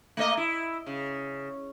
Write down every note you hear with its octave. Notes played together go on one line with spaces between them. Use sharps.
A3 A#3 D#5
E4
C#3